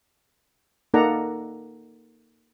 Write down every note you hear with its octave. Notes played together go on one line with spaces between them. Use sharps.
A#3 D#4 A4 D5 F#5 A#5